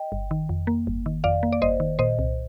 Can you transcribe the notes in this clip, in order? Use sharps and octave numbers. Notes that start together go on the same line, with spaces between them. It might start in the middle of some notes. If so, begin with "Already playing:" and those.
Already playing: D#5 G5
G1
D#3
F2
A#3
G1
D#3
F2 D5 F5
A#3
D5
G1 C5 D#5
D#3
A#2 C5 D#5
C2